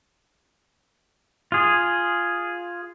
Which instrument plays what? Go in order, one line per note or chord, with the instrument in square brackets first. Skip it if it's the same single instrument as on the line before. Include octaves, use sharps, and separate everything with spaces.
[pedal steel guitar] F4 G#4